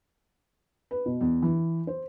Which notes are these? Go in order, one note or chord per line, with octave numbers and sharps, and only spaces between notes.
B4
B2
E2
E3
C5